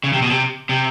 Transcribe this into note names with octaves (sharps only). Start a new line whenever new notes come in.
C#3
C3
B2
C3
C3